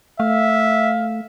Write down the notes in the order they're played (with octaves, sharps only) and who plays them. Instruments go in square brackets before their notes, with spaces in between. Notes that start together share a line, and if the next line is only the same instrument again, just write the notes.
[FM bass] A3 [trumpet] E5 [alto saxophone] F5